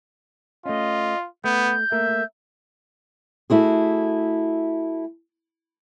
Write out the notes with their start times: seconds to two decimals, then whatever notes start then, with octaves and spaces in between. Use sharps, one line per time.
0.66 A3 C#4 F4 D#5
1.44 A3 B3 G6
1.92 A3 A#3 A#4 E5
3.50 A3 E4 F#4 G#4